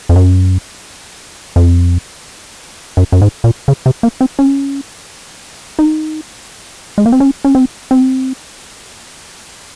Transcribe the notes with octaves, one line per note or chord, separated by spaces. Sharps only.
F2
F#2
F2
F#2
F#2
G#2
A#2
C#3
C3
A#3
C4
C#4
D#4
G#3
A#3
C4
C#4
C#4
C4
C4